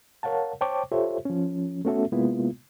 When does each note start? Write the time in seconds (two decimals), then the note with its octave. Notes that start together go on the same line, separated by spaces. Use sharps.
0.23 A#4 C#5 F5 F#5 A5
0.61 C5 C#5 G5 A5 C#6 D6
0.92 F4 G4 A4 C5 C#5 E5
1.25 F3 C#4
1.85 A3 B3 C#4 F#4 A4 E5
2.12 C3 G#3 A#3 B3 E4 F4